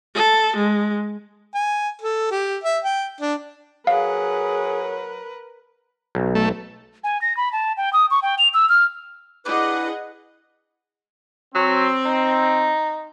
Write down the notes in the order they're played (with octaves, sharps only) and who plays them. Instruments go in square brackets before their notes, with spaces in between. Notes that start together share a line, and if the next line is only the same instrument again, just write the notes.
[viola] A4
G#3
[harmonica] G#5
A4
G4
E5
G5
D4
[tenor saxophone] F#3 [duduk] G#4 [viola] A#4 B4 [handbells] F5
[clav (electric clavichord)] B1
[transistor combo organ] A3
[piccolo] G#5
A#6
B5
A5
G5
D#6
C#6
G5
F7
E6
F6
[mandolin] D4 G4 D5 [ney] E4 [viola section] G#4 D#5 F#5 [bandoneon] B4
[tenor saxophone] F#3 [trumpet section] C4
[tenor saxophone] D#4